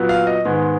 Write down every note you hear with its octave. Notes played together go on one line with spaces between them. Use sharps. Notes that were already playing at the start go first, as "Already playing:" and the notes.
Already playing: A#2 F#3 B3
F5
D#5
G#2 D#3 G#3 B3